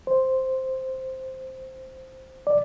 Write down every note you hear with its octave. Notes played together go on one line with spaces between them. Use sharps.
C5
D5